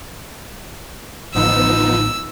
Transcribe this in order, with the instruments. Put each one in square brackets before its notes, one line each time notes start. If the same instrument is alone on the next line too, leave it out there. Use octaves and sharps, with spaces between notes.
[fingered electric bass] A1 A2 D3 [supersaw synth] F3 B3 D#4 [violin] E6